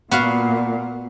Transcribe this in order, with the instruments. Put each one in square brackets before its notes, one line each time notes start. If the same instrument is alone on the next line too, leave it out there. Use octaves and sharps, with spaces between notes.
[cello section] A#2 [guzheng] B3 F#4 F5